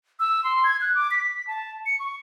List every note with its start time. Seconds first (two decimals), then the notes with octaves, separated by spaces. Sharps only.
0.20 E6
0.44 C6
0.64 G#6
0.81 F#6
0.95 D6
1.11 B6
1.47 A5
1.86 C#7
2.00 C#6